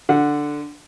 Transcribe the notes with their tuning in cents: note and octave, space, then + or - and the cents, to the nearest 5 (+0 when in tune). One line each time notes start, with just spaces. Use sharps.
D3 +0 F#5 -10